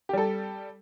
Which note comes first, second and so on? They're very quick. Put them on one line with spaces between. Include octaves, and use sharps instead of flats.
G4 G3 A4